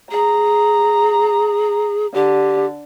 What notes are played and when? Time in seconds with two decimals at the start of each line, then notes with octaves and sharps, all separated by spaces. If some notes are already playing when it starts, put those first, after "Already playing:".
0.11 G#4 A#5
2.14 D3 G4